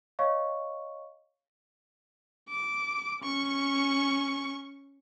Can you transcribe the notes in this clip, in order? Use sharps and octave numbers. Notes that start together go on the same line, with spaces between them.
C#5 D#5 F5 C#6
D6
C#4 C#6